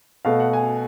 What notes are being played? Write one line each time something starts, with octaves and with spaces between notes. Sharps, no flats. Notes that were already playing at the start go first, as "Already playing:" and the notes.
B2 A3 F5
F#5
G#5